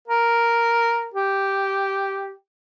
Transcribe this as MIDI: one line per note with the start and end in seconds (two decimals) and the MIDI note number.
0.07 1.09 70
1.14 2.33 67